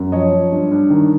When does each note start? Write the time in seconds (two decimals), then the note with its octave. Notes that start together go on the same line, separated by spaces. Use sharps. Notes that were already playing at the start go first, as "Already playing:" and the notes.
Already playing: F#2
0.12 F3 C#5 D#5
0.33 F3
0.52 G2
0.71 G2
0.90 D#3